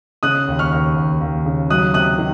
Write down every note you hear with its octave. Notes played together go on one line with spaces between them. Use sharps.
C#3 D#6 F#6
D#2
C#6 F6
D#2
D#2
D#2
C#3
F#3 D#6 F#6
C3 D#6 F#6
D#3